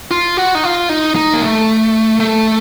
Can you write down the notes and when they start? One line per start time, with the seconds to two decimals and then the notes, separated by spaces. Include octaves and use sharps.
0.11 F4
0.37 F#4
0.55 D#4
0.64 F4
0.89 D#4
1.16 D#4
1.33 A#3
1.41 A3
2.20 A3